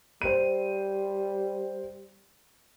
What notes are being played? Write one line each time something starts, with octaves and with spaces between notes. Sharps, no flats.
G3 C5 D#7